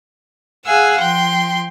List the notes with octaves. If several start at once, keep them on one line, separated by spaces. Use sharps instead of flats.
G#4 F5 F#5 G#5 E6
F3 G5 C6